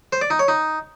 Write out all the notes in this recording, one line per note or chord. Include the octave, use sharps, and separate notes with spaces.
C5
D5
D#4
C#5
D#4